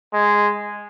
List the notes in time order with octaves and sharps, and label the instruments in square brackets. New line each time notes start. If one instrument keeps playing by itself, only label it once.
[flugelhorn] G#3